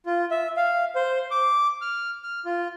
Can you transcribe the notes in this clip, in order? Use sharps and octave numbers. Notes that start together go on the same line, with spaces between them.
F4
E5
F5
C5
D6
F6
F6
F4